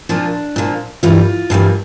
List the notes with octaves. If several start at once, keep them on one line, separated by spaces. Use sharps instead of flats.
A#2 F3 A#3 D4
A#2 F3 A#3
G2 E3 G3 A#3 F4
G2 E3 G3 A#3